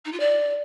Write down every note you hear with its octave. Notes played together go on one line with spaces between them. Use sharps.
D#4
F4
D5